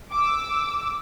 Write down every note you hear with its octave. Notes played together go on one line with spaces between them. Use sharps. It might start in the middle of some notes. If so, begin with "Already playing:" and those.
D6 E6